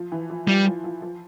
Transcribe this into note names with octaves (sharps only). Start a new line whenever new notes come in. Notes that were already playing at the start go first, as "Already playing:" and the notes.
Already playing: F3
E3
F3
F3 G3
F3
F3
F3